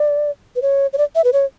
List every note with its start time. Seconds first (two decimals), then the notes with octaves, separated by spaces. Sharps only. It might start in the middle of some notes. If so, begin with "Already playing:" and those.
Already playing: D5
0.56 B4
0.62 C#5
0.93 C#5
0.98 D5
1.15 E5
1.24 B4
1.33 C#5